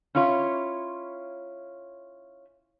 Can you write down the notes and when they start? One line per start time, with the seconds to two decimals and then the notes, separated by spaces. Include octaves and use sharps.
0.15 C#4 E4 F4 C#5